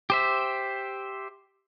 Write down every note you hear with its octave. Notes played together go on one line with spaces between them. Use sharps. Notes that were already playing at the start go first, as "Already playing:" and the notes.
G4 C5 E5